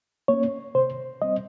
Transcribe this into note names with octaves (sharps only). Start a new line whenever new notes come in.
A#3 C#4 C#5
C3 C5
G3 C4 D#5